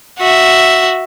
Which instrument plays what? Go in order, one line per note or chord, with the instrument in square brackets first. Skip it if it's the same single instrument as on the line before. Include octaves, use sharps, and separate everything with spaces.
[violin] F#4 E5